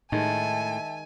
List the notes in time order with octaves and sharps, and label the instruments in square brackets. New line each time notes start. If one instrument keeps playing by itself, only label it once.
[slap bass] A2 [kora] D#3 G#3 [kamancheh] E5 A5 [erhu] G#5